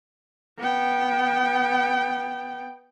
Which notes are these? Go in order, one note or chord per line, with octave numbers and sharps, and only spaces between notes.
B3 G5